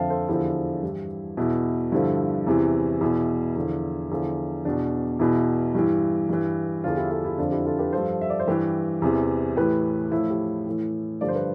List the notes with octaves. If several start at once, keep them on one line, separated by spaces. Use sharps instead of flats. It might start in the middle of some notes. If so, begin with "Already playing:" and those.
Already playing: F2 D3 F3 E5 F5 G5 A5
A4 C5
E2 D3 F3 E4 G4
G2 E3
E2 B2 E4
G2 D3 F3 E4
E2 C3 E3
E2 B2 E4
E2 D3 F3
E2 D3 F3
E2 B2 D4
E2 B2 E4
G2 E3
G2 E3
E2 D3 F3 D4 F4
E4 G4
F4 A4
E4 G4
F2 D3 F3 D4 F4
E4 G4
F4 A4
G4 B4
G2 F3 A4 C5
E5
D5
C5
G2 E3 G4 B4
E2 C3 E3
A2 E3 G4 B4
A2 F3 E4
E4 G4
A2 E3
G2 D3 F3 D5
C5
B4